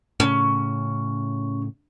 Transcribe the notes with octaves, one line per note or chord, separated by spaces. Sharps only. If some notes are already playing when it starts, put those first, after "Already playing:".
A2 C#3 C#4